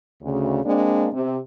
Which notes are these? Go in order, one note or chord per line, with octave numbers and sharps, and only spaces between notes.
D2 C#3
G#3 A#3 C4 D4
C3